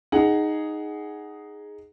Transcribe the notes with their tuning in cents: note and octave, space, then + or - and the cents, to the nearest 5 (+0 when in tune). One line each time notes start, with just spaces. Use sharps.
D#4 +0 G#4 +0 F#5 +10